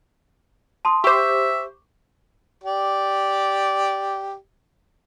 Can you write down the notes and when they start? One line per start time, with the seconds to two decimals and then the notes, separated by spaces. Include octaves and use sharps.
0.85 A5 C6 D#6
1.04 G4 C5 E5 C#6 D6
2.64 G4 D5